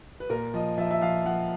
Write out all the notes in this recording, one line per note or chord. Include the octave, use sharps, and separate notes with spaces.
B4
A#2 A#4
F3 D#5
F3 E5
E5
F3 F5
F3 F#5